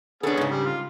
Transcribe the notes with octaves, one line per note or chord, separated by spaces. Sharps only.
B3 C#4 D4 G#4 A4
G#2 C#3
G3
F4